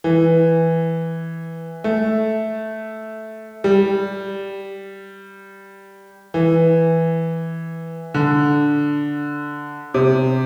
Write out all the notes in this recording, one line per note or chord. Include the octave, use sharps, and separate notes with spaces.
E3
A3
G3
E3
D3
C3